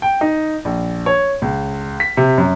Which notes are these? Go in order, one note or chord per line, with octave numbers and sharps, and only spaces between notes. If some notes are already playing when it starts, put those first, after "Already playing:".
G5
D#4
A#1
C#5
C#2
B6
C3
F#2